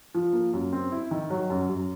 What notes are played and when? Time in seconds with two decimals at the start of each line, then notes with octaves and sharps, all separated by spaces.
0.15 F3
0.33 A#3
0.53 F#2
0.73 C4
0.92 E4
1.11 D#3
1.30 F#3
1.50 F#2
1.70 F#2